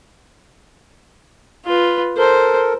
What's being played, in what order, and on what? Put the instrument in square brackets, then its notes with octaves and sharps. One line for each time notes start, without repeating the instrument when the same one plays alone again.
[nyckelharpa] F4 B4
[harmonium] A4 A#4 [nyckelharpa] C5